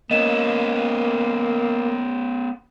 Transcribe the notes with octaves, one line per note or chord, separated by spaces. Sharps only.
A#3 B3 C#4 D#5 E7